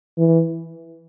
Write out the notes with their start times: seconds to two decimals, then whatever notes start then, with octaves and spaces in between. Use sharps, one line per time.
0.18 E3